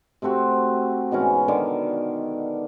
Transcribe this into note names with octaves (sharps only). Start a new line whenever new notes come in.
C3 A3 C4 F#4
G#2 B2 E3 C#4
D3 D#3